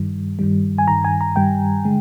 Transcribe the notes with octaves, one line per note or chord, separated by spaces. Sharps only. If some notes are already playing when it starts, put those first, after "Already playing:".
Already playing: G2 D#3 G3
G2 D#3 G3
G#5
G2 D#3 G3 A#5
G#5
A#5
G2 D#3 G3 G5
D3 G#3